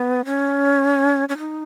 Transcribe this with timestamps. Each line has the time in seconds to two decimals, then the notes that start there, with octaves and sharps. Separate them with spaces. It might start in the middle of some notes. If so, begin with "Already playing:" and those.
Already playing: B3
0.25 C#4
1.29 C#4
1.38 D#4